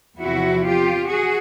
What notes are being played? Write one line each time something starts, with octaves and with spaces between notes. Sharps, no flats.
E2 C3 F3 E4 F#4
F4 G4
F#4 G#4